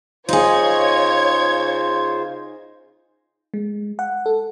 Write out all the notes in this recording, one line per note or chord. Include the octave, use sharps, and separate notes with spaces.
C#3 D#4 F4 G#4 C5 C#5 G#6
G#3
F#5
A4